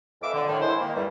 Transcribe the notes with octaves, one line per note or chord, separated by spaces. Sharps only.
F2 G#3 B4 E5 F5 D6
D3
A2 D3 D#3
G#3 E4 C5
D#3 A#3
E2 G2 E3 G3